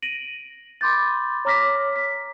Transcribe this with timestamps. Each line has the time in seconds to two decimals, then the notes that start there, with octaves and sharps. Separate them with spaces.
0.02 A#6 D7 D#7 F#7
0.81 B5 C6 D6 G6 A6
1.45 C#5 A#5 D6 F6 A#6 B6
1.96 B6